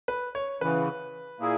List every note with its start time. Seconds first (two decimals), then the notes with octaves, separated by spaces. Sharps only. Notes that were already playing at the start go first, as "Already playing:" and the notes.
0.08 B4
0.35 C#5
0.61 C#3 E3 B3 B4
1.40 A#2 A#3 E4 G#4